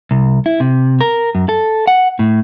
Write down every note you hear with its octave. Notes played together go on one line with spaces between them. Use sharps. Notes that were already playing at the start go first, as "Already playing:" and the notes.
C2
E4
C3
A#4
F#2
A4
F#5
A2